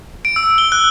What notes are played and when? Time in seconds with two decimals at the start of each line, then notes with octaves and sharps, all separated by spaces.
0.25 D7
0.36 E6
0.58 G7
0.72 F#6